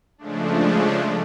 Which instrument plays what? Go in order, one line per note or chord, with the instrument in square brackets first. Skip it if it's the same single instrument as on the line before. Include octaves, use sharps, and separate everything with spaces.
[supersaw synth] C#3 F3 G#3 A3 D4